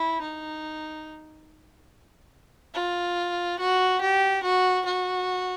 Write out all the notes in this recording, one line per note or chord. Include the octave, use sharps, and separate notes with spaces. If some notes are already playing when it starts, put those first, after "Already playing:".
Already playing: E4
D#4
F4
F#4
G4
F#4
F#4